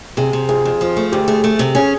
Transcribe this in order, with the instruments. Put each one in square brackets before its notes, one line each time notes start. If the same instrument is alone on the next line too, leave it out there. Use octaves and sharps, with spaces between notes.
[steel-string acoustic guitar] C3 [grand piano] G#4
[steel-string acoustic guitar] C3
[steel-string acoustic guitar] F2 [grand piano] G#4
[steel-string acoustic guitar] F2
F3
A3
[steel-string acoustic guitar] D2 [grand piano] G4
[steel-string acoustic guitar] A3 [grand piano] G#4
[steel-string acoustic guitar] A3
C3
[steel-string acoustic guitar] C#4 [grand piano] G#4